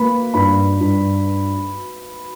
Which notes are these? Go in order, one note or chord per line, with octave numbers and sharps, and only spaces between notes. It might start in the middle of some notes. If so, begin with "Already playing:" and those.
Already playing: A#3 B4 B5
G2 B4 B5
G2